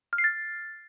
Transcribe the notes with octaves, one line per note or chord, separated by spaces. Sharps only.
F6
C7
A6